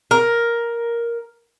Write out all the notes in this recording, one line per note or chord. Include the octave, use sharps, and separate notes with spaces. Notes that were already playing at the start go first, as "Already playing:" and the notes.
A#4